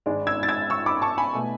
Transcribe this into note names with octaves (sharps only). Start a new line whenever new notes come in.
G#1 G#2 G#3 D4
E6 G#6
A6
E6 G#6
C#6 E6
B5 D6
A5 C#6
G#5 B5
B2 A3